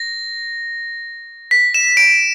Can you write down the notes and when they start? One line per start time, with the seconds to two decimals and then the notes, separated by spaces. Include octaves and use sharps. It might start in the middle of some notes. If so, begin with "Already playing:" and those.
Already playing: A#6
1.51 B6
1.74 E7
1.97 D7